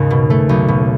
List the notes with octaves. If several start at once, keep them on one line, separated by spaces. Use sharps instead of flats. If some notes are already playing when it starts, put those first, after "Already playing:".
Already playing: D#2 G#2 C#3
B2
A3
B1
B2